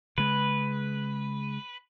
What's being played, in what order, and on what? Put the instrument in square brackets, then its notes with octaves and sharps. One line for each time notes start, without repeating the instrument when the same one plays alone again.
[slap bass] C#3 G#3 [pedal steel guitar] B4